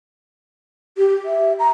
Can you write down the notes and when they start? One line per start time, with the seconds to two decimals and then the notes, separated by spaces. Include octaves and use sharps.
0.98 G4
1.25 E5
1.59 A#5